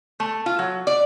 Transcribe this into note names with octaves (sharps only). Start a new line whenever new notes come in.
A3
F4
F#3
D5